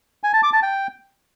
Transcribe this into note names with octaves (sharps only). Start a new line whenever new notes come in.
G#5
A5
D6
A5
G5